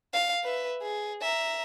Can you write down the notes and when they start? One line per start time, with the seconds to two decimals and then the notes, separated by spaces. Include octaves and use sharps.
0.13 F5
0.44 B4 E5
0.82 G#4
1.22 E5 A#5